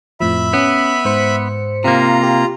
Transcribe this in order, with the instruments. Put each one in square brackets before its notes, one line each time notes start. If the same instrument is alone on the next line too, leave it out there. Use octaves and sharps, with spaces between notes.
[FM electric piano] F2 A2 F3 [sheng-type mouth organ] E5 B5
[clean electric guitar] B3 [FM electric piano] C#4
[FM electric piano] G#2 C5 C#7
[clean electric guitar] C3 A#3 [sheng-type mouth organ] F4 A#5
[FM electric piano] G4